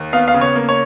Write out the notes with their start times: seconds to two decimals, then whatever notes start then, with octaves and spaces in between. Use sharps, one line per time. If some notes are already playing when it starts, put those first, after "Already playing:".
Already playing: D#2
0.13 B3 F5
0.28 F5
0.34 C#3
0.41 C#5
0.55 A#3
0.69 C#5